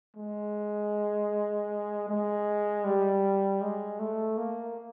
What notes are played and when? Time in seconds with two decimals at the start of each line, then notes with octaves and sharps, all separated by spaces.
0.17 G#3
2.09 G#3
2.85 G3
3.61 G#3
3.99 A3
4.37 A#3